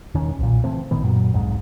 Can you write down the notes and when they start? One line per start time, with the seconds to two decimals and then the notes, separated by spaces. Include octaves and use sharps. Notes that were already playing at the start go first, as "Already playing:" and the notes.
0.14 E1 D#3 C#4
0.39 B1 A#2
0.64 C#3 E3 A3 C4
0.91 A1 A2 D#3 B3
1.04 F#2 A#2 F#3
1.33 B1 F2 G#2